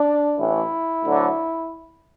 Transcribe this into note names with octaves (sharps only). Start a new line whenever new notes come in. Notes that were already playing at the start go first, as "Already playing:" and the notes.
Already playing: D4
A1 A2 E3 E4
D2 D3 F#3